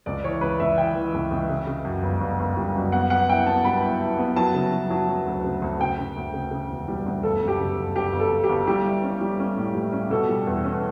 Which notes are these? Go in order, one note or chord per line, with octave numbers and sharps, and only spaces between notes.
C#2 D5
E3 C#5
C#2 B4
C#2 E5
E3 G5
E3
C#2
C#2
C#3
C#3
F#2
G1
G1
G1
G3
F#2
B3 F#5
B3 F#5
E4 G5
B3 A5
G2 B5
E4
E4
B3
F#3 A5
C#3
F#3
F#3
F#3
D2
C#3
D2
C#3 G5
C#3
D2
C#3
C#3
E1
G3
D2
G1 A4
F#2
G4
C#3
G1
G1 G4
G1
A4
G1
G4
G1
G3 G4
E4
C#4
G3
C#4
A2
G3
C#4
B2 A4
G3
E2
C#4